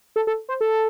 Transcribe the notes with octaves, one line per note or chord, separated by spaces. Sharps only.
A4
A4
C5
A4